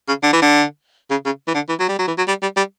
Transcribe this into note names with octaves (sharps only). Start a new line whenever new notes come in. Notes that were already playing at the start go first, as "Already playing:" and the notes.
C#3
D3
E3
D3
C#3
C#3
E3
D3
E3
F#3
G3
F#3
E3
F#3
G3
G3
G3